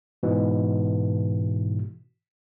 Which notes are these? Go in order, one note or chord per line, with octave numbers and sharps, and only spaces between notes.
G#2 B2 E3